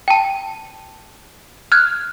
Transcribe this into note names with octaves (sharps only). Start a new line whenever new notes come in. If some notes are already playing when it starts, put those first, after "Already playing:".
G5 A5
F6 F#6 G#6